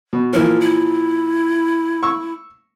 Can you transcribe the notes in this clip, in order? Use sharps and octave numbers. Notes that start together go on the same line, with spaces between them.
B2
A#2 E3 F3 A#4
E4
C#6 E6